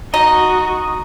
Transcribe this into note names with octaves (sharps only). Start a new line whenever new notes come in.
D#4 F#4 D#5